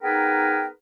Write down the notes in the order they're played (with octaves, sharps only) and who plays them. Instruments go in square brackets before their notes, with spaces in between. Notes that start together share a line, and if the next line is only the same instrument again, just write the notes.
[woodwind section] B3 D#4 G#4 A#4 B4 G5